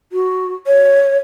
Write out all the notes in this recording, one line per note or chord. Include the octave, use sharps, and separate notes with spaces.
F#4
C#5